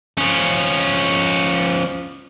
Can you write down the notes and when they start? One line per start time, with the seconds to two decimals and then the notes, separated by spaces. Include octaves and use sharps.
0.18 F3 C#4